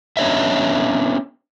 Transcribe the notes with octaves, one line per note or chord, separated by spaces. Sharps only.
B3 C#4 D4 C#5 D#5 E5